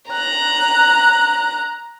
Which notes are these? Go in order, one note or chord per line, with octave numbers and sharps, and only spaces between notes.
A#5 F#6